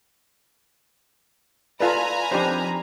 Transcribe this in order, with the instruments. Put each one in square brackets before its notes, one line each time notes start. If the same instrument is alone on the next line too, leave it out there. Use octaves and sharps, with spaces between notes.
[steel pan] F4 A4 B4 [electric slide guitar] D5 F5 [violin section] G#5 A#5 B5
[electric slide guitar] F2 D#3 [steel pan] D4 G4 C5